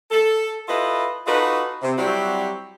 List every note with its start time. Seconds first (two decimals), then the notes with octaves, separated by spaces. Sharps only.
0.11 A4
0.69 E4 F4 G4 A4 B4 D#5
1.27 D#4 F4 F#4 A4 B4 D#5
1.82 C3
1.98 F#3 G3 C4 E4 F#4 G4